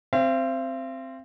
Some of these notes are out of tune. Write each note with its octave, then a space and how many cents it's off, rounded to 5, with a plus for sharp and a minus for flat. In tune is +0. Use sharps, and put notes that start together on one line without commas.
C4 +0 F5 -45